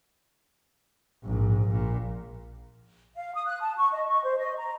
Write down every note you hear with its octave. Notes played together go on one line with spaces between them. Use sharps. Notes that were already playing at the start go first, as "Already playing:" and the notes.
A#1 G#2
A#1 A#2
F5
D#6
F#6
A5
C#6
D#5
C#6
C5
D#5
A#5